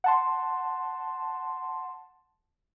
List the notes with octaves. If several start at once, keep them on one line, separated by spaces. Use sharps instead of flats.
F#5 A5 C6